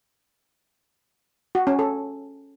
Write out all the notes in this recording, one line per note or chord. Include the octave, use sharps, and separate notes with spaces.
F#4
C#4
A4